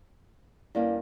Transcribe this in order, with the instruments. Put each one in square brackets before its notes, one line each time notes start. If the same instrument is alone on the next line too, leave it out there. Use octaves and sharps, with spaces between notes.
[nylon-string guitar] G2 A#3 C#4 [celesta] E4 D5 F5